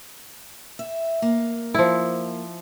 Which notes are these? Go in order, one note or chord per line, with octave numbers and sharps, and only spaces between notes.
E5
A#3
F3 E4